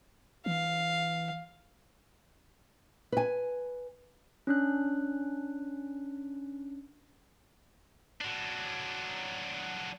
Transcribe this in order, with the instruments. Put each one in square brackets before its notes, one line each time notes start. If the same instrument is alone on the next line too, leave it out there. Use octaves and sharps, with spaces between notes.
[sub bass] E3 [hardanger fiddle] F5
[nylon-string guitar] B4 G#5
[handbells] C#4 D4 F#6
[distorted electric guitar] F#3 D4